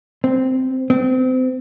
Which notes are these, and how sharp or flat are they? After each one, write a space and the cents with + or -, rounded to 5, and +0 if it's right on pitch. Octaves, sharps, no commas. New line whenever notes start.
C4 -10
C4 -30